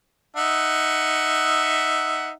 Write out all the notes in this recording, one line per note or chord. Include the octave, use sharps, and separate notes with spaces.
D#4 E5 F#5